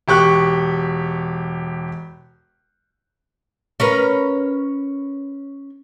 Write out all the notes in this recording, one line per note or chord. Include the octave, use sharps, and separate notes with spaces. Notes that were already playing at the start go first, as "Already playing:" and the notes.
E1 G4 C#6 F#6
C#4 A#4 B4